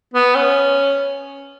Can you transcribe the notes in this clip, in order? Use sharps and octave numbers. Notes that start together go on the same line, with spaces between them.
B3
C#4